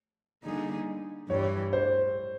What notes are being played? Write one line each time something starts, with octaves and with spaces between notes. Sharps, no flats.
D3 G3 A#3 D#4 G#4
G2 E3 G3 C#5
C5